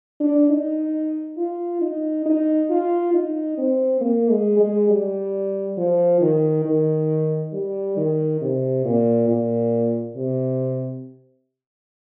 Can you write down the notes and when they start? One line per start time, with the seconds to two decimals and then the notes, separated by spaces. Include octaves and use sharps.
0.20 D4
0.50 D#4
1.37 F4
1.81 D#4
2.25 D#4
2.70 F4
3.14 D#4
3.58 C4
4.01 A#3
4.31 G#3
4.60 G#3
4.90 G3
5.78 F3
6.21 D#3
6.65 D#3
7.53 G3
7.97 D#3
8.41 C3
8.85 A#2
9.28 A#2
10.16 C3